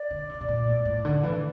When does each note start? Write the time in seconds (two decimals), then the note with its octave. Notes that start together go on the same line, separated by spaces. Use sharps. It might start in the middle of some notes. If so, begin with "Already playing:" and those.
Already playing: D5
0.11 D3
0.29 C3
0.41 C3
0.48 A#2
0.67 A2
0.85 A2
1.05 D3
1.23 E3